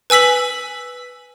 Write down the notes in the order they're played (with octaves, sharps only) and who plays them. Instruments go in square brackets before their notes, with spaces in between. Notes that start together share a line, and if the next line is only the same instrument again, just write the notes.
[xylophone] B4 G#5 E6 B6 F#7